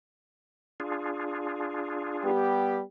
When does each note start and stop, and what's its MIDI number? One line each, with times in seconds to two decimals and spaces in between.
0.80 2.31 62
0.80 2.31 65
0.80 2.31 68
2.24 2.81 55
2.24 2.81 59
2.24 2.81 67